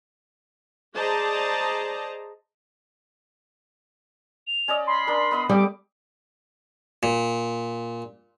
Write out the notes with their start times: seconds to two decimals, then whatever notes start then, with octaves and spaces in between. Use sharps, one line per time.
0.95 G#4 C5 D5 D#5 A5 A#5
4.47 F7
4.68 C#4 D5 D#5
4.87 B5 C6
5.07 D4 A#4
5.31 B3 D#5 D#6
5.49 G3 G4 A4 D6
7.03 A#2